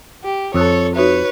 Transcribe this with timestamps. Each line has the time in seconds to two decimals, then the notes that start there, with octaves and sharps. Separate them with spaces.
0.24 G4
0.54 F2 A4 C#5 D#6 E6 F#6
0.96 D#4 F#4 B4 C#5 E5